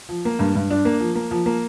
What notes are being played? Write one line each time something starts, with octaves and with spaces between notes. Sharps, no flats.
F3
A#3
G2
G2
D4
A#3
F3
A#3
F3
A#3